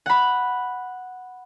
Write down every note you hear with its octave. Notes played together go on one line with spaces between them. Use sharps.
F#5 B5